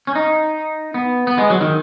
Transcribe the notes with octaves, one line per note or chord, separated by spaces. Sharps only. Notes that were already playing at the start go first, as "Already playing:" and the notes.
C#4
D#4
B3
B3
G#3
F#3
D#3